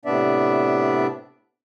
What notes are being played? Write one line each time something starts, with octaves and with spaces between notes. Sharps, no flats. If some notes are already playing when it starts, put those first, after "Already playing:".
A2 C3 B3 D4 D5 E5